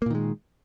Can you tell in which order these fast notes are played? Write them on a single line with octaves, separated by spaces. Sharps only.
A#3 A#2 D#3 G#3